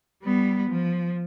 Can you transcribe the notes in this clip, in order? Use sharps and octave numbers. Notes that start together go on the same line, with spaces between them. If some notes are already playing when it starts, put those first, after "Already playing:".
G3 B3
F3